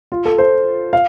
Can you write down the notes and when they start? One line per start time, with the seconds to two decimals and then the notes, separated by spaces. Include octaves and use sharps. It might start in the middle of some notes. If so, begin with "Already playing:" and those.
0.12 F4
0.25 A4
0.38 C5
0.93 F5